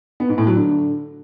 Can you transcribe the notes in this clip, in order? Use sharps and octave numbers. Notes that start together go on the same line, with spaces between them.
B3
G#2
A2
F#3
D3